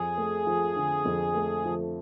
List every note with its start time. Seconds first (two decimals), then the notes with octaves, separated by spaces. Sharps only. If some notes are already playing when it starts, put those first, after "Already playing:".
Already playing: F2 G#4
0.18 A3
0.47 F3
0.76 D3
1.05 F2
1.35 A3
1.65 F3